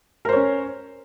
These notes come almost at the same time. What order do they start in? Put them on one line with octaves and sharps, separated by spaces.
A#4 C5 C#5 C#4